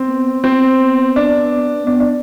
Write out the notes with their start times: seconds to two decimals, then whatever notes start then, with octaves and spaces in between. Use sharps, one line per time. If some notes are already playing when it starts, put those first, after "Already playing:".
Already playing: C4
0.08 B3
0.44 C4
0.80 B3
1.16 D4
1.87 B3 D4
2.00 D4